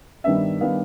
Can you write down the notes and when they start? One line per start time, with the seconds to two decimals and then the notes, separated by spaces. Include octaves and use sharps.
0.24 G2 D#3 G3 B3 D4 E5
0.61 D#3 G3 B3 D4 F5